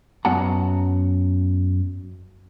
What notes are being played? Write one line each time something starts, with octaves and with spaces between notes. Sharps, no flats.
F#2 F#3 B3 F#5 A5 A#5